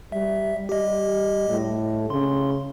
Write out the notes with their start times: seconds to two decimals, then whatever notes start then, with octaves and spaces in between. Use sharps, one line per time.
0.12 G3 E5
0.69 G3 G4 D#5
1.49 A2
2.10 C#3 C6